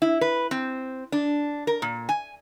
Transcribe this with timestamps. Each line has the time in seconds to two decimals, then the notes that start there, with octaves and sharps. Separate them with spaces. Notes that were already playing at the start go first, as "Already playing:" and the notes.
0.02 E4
0.21 B4
0.51 C4
1.12 D4
1.67 A#4
1.82 A#2
2.09 G#5